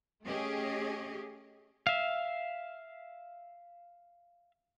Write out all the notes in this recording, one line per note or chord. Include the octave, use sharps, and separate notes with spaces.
A3 C#4 G4 G#4 D#5
E5 F5